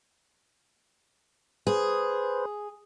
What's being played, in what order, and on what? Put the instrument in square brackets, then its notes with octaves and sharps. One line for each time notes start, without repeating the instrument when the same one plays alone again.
[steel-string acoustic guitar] G#4 [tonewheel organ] B4 C5